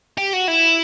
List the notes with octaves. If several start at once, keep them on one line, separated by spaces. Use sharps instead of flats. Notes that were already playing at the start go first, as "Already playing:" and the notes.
G4
F#4
E4